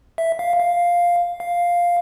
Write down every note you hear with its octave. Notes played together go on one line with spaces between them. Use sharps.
E5
F5
F5
F5